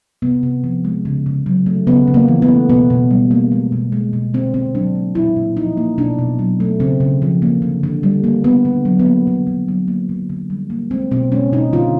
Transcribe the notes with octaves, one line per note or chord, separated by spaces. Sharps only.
C3 B3
C3
F3
G#3
C#3
C#3
F#3
A3
C#3 B3
C#3
A#3
E3
B3
A3
B2 B3
B2
G3
A#3
G#3
B2
G#3
B2
D3 C4
D3 C4
F#3 D4
A#3
A#2 E4
A#2
F3 D#4
A#3
B2 D4
B2
F#3
A3
C#3 C4
C#3
F3
A#3
D3
D3
G3
A#3
D3 B3
D3
F#3
B3
A#3
D3
D3
F#3
A#3
D3
D3
G3
A#3
G#3 C4
B2 C4
G#3 C#4
B2 D#4
D3 F4